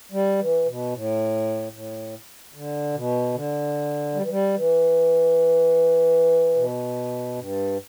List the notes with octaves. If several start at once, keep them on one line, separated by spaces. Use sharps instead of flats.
G3
E3
B2
A2
A2
D3
B2
D3
G3
E3
G3
E3
B2
G2